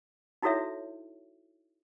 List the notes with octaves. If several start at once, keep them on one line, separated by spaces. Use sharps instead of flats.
D#4 E4 F#4 A4 C#5 E5